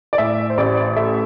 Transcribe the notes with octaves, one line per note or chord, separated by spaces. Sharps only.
D5
A2 E5
C5
A1 D5
A3 E5